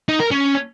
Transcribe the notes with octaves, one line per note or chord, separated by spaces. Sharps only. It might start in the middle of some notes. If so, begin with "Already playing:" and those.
D#4
A#4
C#4